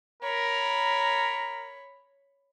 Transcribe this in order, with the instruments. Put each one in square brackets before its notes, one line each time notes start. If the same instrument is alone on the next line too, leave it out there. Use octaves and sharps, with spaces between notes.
[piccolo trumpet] A#4 [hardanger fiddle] C#5 B5